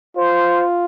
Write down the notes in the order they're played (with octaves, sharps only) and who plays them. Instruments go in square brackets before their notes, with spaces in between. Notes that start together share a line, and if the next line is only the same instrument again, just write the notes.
[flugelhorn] F4 [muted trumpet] C5